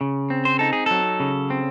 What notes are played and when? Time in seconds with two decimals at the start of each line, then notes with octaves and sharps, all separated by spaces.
0.01 C#3
0.30 C4
0.45 C5
0.59 D#4 A4
0.73 G#4
0.86 F#3 A4
1.20 C#3
1.50 C4